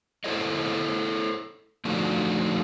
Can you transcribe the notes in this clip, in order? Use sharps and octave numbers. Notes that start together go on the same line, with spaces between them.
E4 A4 C5 C#5 D#5
F3 A3 D4 D#4 F#4 A4